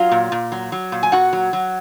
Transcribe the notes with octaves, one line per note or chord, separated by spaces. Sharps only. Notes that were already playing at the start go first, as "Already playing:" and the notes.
Already playing: F#3 F4 F5
A#2
A#2
F#3
F#3
A#2
G#5
A#2 F#4 F#5
F#3
F#3